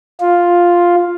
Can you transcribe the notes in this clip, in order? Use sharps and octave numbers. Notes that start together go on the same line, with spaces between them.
F4